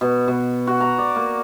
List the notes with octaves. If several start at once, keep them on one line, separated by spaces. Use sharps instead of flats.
B2
B2
F#4
A#5
D5
A#3